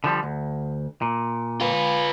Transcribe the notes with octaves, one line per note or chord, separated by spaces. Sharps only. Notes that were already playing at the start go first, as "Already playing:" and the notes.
D3 F3 G3
D2
A#2
F4 B4